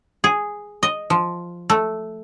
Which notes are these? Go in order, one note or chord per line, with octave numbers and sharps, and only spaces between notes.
G#4
D#5
F3
A3